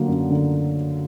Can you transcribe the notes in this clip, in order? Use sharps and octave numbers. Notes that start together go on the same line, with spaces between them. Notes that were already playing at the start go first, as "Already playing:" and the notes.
Already playing: D3 F#3 A#3
F#2
D3